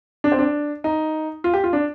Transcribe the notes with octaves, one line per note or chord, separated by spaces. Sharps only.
D4
C4
D4
D#4
F4
G4
F4
D4